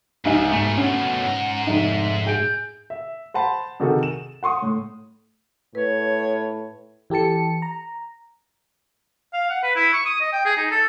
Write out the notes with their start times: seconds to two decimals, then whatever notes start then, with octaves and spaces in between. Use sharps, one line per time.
0.25 C2 G#2 F3 D#4 E5 G#5
0.52 G#2 B2 A3
0.77 C#4 F#5
1.25 G#2 A#5
1.67 F1 D#4 E5
2.26 G#4 G6 D7
2.90 E5
3.34 C5 F#5 A5 B5 C6
3.80 C3 D#3 F#4 G#4 A4
4.03 E7
4.43 F#5 C6 C#6 D#6
4.62 A2
5.75 A2 B4 C#5
7.10 E3 G4 A4 A5 C#7
7.62 A#5
9.33 F5
9.50 F#5
9.63 B4
9.76 E4
9.93 C#6
10.05 D#6
10.21 D#5
10.33 G5
10.45 G#4
10.57 D#4
10.71 A4